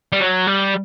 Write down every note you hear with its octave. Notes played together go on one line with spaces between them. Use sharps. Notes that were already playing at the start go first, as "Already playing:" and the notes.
G3
F#3
G3